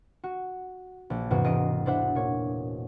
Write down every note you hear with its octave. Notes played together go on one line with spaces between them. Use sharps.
F#4
A#1
E2 G#2 C3 F#4
E1 D#5 C7 D7
D4 E4 C5 E5 F#5
A#2 C#5